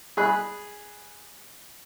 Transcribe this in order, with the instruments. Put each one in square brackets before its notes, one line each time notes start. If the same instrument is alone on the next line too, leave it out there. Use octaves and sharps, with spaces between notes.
[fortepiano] G#4 B5 F#6